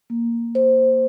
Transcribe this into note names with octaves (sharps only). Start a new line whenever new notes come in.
A#3
C5